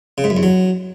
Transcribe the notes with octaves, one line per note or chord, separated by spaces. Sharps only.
C#3
G#2
F#2
E2
F#3